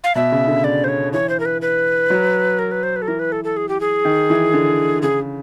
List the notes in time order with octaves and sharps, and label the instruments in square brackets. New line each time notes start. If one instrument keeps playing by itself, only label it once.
[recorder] F5
[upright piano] B2 [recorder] E5
[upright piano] C#3
D3
[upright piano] C#3 [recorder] D5
[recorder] C5
C#5
[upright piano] E3 [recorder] C#5
[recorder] C5
A#4
B4
B4
[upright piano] F#3
[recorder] A#4
B4
C5
B4
A4
[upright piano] E3 [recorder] A#4
[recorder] B4
A4
A4
G#4
G4
G#4
[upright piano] D#3
E3
D3
[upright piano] C#3 [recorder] G#4